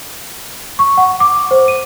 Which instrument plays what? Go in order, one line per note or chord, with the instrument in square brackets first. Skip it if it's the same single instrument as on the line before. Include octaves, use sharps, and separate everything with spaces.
[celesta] C#6
F#5
D6
C5
D#7